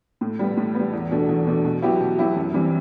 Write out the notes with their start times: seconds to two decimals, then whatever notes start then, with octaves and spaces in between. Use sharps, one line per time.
0.21 A2
0.39 G3 B3
0.57 A2
0.75 G3 B3
0.93 E2
1.11 B2 A3 D4
1.29 E2
1.47 B2 A3 D4
1.64 B2
1.82 F#3 B3 E4 G4
2.00 B2
2.18 F#3 B3 E4 G4
2.36 F#2
2.54 E3 G3 C4